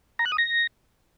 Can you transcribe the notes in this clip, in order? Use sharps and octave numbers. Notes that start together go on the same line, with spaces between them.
A#5
F#6
D#6
A#6